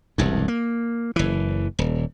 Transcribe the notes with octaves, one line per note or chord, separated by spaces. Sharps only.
E1 C2 G2
A#3
F#1 E3
D#1